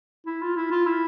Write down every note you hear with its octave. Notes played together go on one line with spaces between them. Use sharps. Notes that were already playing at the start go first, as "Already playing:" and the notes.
E4
F4
E4
F4
E4